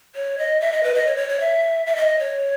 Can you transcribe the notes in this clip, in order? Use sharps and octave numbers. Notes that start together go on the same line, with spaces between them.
C#5
D#5
E5
D#5
B4
D#5
C#5
C#5
C#5
E5
E5
D#5
C#5